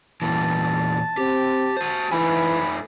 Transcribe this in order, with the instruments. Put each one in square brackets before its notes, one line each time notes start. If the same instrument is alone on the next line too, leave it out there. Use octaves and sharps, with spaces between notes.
[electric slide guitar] E2 A#2 E3 [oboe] A5
[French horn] C4 [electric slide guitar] G4
[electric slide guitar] F#4 C5
[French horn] E3 [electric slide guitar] A3 D#4 G#5 [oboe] B5